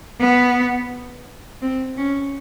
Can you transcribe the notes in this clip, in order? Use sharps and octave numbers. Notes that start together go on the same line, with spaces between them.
B3
C4
C#4